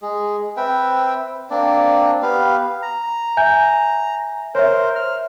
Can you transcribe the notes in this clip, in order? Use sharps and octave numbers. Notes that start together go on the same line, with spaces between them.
G#3 G#4
C4 B4 E5 G5
A#3 C4 D4 D5
B3 G4 B4 F5
A#5
E5 G#5 G6
A#4 C5 C#5 E5
F6